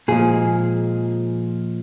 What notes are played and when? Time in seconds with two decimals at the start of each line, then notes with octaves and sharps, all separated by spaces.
0.08 A#2 F3 G#3 G#4